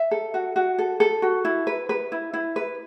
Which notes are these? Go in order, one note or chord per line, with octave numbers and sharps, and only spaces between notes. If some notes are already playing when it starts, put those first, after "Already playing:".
Already playing: E5
A4
F#4
F#4
A4
A4
F#4
E4
B4
B4
E4
E4
B4